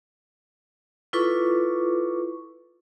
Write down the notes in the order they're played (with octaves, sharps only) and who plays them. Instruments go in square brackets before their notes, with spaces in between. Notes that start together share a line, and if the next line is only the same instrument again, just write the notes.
[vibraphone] E4 F4 A4 B4 C#6 D6